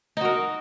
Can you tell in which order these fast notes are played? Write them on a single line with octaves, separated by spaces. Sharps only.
D#4 F#4 A#4